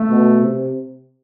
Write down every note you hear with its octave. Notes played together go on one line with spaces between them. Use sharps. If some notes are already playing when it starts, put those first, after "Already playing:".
Already playing: A3
B2
C3